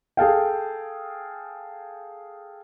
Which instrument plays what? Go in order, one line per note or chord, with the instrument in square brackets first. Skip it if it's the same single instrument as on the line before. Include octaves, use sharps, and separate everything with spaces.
[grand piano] G#4 A4 F5 G5